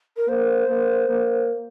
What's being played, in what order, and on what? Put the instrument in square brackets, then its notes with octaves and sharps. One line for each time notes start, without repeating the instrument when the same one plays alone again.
[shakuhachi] A#4
[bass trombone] A#3 [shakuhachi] C5
[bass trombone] A#3
A#3